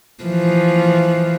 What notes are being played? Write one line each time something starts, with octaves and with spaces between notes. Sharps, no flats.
E3 F3